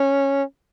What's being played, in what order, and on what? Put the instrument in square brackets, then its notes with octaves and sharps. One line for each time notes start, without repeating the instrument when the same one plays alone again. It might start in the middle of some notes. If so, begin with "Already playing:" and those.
Already playing: [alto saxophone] C#4